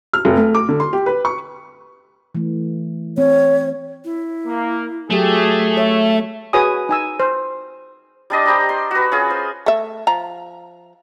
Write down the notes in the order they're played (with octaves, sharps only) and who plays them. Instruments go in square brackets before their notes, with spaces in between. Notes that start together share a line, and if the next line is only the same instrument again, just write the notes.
[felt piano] F6
F1
A3
D6
D3
C6
G4
B4
C#6
[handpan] E3 A3
[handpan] C4 [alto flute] C#5
[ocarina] E4
[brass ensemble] A#3
[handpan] F#3 G4 [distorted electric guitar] A3 [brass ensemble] G#4
[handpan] C#5 [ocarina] E5
[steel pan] F#4 G#4 B4 C#5 G#5 D#6
D#4 G#5 E6
C5
[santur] G3 D4 D#5
G4 C5 A#5 B5
C6
F#4 B4
C#4 F4 G#4
C5
[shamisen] A3 E5
F3 A#5